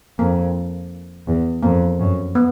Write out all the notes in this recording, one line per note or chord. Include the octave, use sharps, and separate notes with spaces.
F2 A#3
E2
F2 A#3
F#2
B3